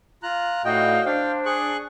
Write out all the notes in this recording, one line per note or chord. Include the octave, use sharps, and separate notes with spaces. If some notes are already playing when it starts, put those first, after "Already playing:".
F4 A#5 F#6
A2 D#4 F#4 D5 D#5 F5 G5
D4 C5 F5 G5
G#4 C#6 F#6